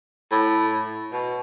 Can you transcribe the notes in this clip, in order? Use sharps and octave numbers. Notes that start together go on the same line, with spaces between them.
A2
B2